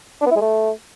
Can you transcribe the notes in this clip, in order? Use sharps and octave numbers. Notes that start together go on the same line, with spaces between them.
D4
B3
E4
G#3
A3